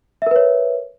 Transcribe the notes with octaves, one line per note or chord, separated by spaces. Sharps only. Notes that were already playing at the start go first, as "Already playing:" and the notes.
A#4 B4 C#5 E5